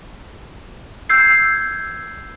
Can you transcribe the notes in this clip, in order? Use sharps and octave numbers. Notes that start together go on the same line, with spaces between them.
E6 G6 G#6 C7